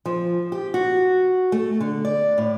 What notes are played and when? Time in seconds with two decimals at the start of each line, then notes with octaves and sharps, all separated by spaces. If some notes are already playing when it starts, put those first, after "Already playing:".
0.06 F3
0.52 G4
0.74 F#4
1.52 A3
1.80 D3
2.05 D5
2.38 A2